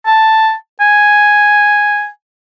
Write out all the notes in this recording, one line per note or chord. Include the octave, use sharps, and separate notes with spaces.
A5
G#5